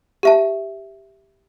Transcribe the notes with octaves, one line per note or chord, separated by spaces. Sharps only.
G4 E5 A5